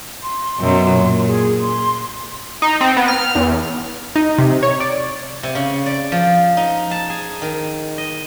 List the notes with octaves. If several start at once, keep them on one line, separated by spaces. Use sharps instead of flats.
C6
F#2 B2 F#3
A#2
G#4
C6
D#4
C4
B3
F6
E2
D#4
C3
C#5
D5
C3
C#3
D5
F3
D#4
A5
G#4
D#3
D#5